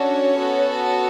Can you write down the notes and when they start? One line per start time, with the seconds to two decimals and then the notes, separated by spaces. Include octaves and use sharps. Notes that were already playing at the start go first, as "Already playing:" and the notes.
Already playing: C#4 D4 F#4 A4 C#5
0.36 B3 F#4 A4